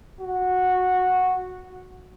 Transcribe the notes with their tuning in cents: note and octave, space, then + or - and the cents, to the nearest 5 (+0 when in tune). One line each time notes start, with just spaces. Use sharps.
F#4 -10